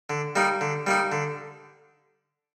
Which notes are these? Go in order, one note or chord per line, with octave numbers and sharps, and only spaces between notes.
D3
G3 A#3 D#4
D3
G3 A#3 D#4
D3